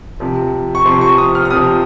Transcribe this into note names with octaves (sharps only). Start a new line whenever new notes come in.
C3 F3
C#6
C3 F3 C6
C#6
D#6
F6
F6
C3 F3 D#6